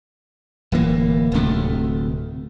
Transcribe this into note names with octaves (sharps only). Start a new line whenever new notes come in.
D1 E3 A#3
D1 D2 C3 A3